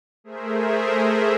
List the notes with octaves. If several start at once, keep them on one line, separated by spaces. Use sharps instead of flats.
A3 G#4 A#4 C5 E5